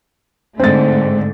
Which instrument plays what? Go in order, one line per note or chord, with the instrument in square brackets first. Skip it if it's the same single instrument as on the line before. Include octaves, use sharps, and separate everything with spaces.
[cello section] G#2 D3 A3 [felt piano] C4 A6